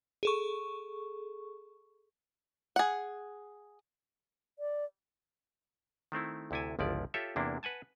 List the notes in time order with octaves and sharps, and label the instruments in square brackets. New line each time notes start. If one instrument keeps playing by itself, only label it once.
[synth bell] G#4 A4 C#6
[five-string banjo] G#4 F#5
[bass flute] D5
[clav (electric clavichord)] D#3 A3 C4 E4
D2 C3 E4 A4 G#5
G1 C#2 F3 E4 D5
F4 G4 A4 C#5 E5
E2 C3 A#3 D4 E4
B4 F#5 G#5 A5